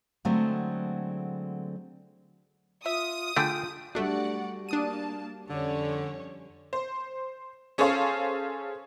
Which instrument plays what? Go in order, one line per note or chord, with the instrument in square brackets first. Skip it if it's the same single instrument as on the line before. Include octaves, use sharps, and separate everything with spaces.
[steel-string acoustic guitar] D3 F#3 G#3 A3 C4
[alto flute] F4 [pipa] E5 [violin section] D#6
[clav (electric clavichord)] D3 A3 [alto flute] F4 [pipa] G#4 G5
[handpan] G3 F#4 [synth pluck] A3 D4 [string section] D5 F#5
[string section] A#3 A5 [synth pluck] D4 D#6 D#7
[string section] F2 C#4 C#5 [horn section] D3
[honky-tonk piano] C5
C#4 G#4 A4 C5 C#5 F5